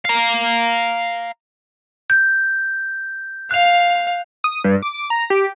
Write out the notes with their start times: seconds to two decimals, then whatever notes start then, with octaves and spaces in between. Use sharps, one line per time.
0.05 F5 A#5
2.10 G6
3.51 F5 F#6 F7
4.44 D#6
4.64 G2
4.82 D6
5.10 A#5
5.30 G4